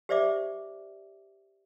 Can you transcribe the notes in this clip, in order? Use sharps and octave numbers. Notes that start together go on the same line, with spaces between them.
G4 C5 D5 E5 D6